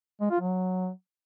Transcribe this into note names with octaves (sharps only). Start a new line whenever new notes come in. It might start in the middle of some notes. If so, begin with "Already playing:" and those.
G#3
F4
F#3